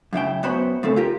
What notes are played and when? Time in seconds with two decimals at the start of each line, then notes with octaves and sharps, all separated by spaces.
0.13 F#2 C#3 E4 G5
0.43 F#2 F#3 B3 C5 C#5 B5
0.83 A2 C#3 C4 A4
0.96 F4 G4 A#4